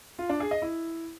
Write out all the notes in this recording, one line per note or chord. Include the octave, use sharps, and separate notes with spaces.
F4
D4
G#4
D#5
E4